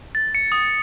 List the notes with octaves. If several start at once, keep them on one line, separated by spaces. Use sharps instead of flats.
A6
C#7
D#6